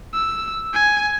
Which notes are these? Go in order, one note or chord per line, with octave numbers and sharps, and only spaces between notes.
E6
G#5